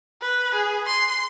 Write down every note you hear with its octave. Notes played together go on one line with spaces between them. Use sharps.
B4
G#4
C6